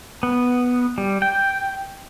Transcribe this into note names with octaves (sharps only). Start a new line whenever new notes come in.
B3
G3
G5